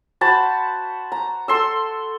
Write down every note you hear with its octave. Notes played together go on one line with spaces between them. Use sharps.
F#4 C5 A5 B5
A#5
A4 C6 E6